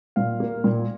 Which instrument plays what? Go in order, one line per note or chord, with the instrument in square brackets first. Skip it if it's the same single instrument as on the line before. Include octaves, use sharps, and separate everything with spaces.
[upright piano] A#2 F5
A#3
A#2